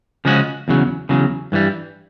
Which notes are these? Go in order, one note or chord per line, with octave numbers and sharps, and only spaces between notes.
C#3 F3 G#3 C#4 F#4
E2 C#3 F#3
E2 C#3 F#3
G2 E3 G3